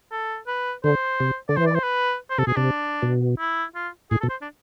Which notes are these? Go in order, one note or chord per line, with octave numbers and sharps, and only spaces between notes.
A4
B4
D3 C5
C3
D3 D5
E3 C5
D5
C5
B4
C5
C3 A4
B2 G#4
C3 D4
B2
E4
F4
A2 G#4
A4
B2
C5
D4